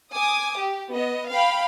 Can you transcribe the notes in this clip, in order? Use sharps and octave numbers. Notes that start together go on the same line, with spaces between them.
G#5 D6 D#6
G4
B3 D#5
F5 G5 B5